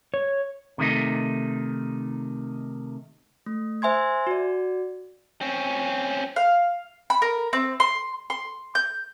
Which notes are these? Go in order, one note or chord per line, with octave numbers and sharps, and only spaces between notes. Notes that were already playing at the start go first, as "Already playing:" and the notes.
C#5
C3 D#3 A3 D#4
A3
C5 E5 G#5 C6 G#6
F#4 D5
C4 C#4
F5
B5
A#4
C4
C6
C6
G6